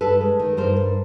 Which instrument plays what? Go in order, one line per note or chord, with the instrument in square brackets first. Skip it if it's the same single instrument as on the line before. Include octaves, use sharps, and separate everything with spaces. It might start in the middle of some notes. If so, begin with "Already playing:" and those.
[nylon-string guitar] G2 A4 B4
G#3
D#3
G2 A#4 C5
G2